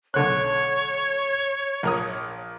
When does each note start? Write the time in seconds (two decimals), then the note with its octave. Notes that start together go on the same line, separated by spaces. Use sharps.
0.14 B1 D3 C#5 F#6
1.83 A#1 A#4 D#6